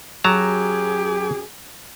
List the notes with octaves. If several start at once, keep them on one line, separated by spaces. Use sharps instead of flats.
F#2 F#3 G4 G#4 A5 A#5